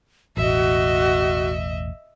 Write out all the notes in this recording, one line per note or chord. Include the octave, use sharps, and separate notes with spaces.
E1 A1 F#4 D#5 E5